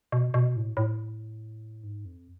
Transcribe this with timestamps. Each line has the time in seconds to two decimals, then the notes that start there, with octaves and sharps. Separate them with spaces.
0.12 B2
0.34 B2
0.56 A2
0.77 A2
1.84 G#2
2.05 F2